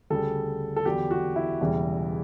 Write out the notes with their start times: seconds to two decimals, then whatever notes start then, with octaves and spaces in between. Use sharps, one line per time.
0.10 D2 C#3 G3 A4
0.76 A4
0.85 E2 D3 F#3 G4
1.11 F#4
1.36 E4
1.60 E1 E2 C#3 E3 G3